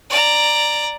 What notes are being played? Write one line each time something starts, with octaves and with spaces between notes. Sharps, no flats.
D5 A#5